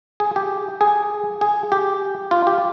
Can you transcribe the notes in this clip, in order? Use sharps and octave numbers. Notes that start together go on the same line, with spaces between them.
G#4
G4
G#4
G#4
G4
F4
G4